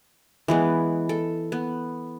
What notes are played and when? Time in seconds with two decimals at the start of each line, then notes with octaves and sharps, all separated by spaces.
0.48 E3 G#3 B3
1.09 A4
1.52 B3